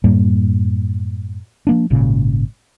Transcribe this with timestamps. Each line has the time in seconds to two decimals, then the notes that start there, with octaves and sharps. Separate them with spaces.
0.04 F#2 A2 G3 A#3
1.67 F3 A#3 D4
1.90 G#1 A#2 C#3